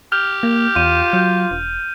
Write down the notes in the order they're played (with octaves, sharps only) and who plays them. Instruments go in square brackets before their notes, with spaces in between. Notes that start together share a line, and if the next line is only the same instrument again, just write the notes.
[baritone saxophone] G4 [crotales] F6 G6 F7
[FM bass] A#3
[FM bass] E2 [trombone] F4 [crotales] D#7
[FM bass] F#3 [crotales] G6
[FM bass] E1